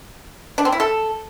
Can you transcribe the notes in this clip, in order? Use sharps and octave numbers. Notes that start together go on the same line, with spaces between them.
D4
C4
E4
A4